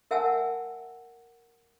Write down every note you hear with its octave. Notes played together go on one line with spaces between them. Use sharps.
A#4 E5 F#5 G#5 A5 E6